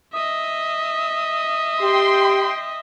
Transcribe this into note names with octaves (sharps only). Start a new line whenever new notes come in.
D#5 E5 D#6
G4 G5 C6